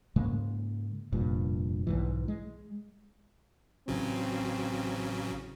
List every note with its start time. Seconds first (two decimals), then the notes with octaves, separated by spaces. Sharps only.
0.16 G#2 C#3 G#3 A#3
1.13 F1 G2 A#2
1.87 B1 G#2 E3
2.28 G#3
3.88 A1 C#3 F#3 C4